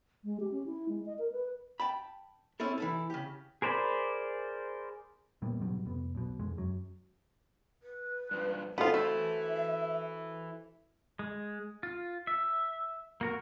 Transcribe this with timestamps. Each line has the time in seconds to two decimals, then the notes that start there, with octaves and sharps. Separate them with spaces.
0.24 G#3
0.40 G4
0.51 C#4
0.66 E4
0.89 G#3
1.06 D#5
1.19 A#4
1.32 B4
1.80 G5 A5 B5
2.60 C4 C#4 E4 A4
2.78 E3 E4 A4
3.10 C#3 G4
3.62 G#4 A#4 C5 D5 B5
5.42 A#2 G3 A#3 B3
5.60 G#2 B2 F#3 G3
5.86 F1 F2 B3
6.15 B1 B2
6.40 F1 F2 G#3
6.57 F#2 F#3
7.83 B4
8.31 G2 F3
8.78 F2 A2 C#3 B3 F4 F#4 A4 C5
8.94 E3 A3 E4 E5
11.19 G#3
11.83 F4
12.27 E5
13.21 A#3 F#4 A#4